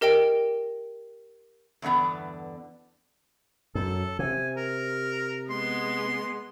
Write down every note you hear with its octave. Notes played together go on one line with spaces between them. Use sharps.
G4 A#4 D#5 G5 D7
E2 G2 D3 B3 D5
F#2 A4
C3 G#5
A#4
G#3 B3 C6